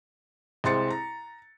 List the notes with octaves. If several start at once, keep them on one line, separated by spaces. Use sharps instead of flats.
C2 G#3 C4 C6 A6 C#7
A#5